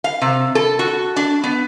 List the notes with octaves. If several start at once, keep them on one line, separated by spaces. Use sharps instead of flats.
F5
C3
A4
F#4
D4
B3